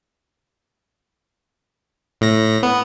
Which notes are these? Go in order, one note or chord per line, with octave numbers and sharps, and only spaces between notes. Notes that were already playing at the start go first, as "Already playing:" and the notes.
A2 A#6
B3